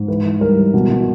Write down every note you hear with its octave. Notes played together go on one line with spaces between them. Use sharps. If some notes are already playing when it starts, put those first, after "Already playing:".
Already playing: G#2
E3 B4
E3
G3 A#4
E3
B2
B2